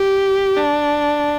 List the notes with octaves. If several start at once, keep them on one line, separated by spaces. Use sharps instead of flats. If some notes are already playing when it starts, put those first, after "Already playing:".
Already playing: G4
D4